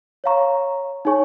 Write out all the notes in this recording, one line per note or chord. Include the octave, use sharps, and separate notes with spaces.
C#5 F5 A#5 C#6
D#4 G#4 C#5 G#5 C#6